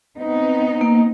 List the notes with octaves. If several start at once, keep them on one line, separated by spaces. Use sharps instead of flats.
B3 C4 D#4
A#3